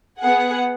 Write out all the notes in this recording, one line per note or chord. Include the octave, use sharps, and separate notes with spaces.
B3 G#4 F#5